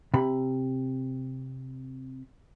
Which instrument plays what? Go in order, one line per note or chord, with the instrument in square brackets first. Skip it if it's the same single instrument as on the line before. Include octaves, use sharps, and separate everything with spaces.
[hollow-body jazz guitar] C3 B5